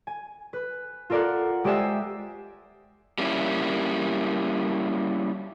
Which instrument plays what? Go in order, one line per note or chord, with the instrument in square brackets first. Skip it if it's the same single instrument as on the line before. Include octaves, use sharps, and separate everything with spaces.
[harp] G#5
B4
F4 A4 A#4 D5 F5 F#5
G#3 G4 C5 D5 E5 G#5
[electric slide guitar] G3 A#3 C#4 E4